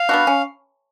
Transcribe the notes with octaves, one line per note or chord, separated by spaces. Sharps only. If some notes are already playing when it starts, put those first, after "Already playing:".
Already playing: F5
B3 D4 F#4
C#4